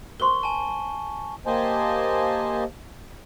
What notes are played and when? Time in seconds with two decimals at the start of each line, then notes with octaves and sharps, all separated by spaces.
0.20 A#4 C5 C6 C#6 G7
0.43 G#5 A5
1.46 A#3 G4 C5 D#5 G#5 A5